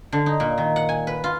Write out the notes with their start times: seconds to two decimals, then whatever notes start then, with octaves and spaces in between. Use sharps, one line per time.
0.12 D3
0.26 D#4
0.40 A#2
0.58 D#3
0.76 F#5
0.89 G#5
1.07 B4
1.24 F4